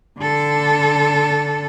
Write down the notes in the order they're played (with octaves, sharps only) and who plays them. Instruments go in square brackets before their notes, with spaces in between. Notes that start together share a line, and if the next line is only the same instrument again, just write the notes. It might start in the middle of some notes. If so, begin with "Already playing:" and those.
[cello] D3 A4